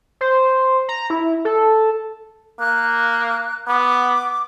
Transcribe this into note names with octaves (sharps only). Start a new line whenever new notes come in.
C5
A#5
E4
A4
A#3 F#6
B3 D6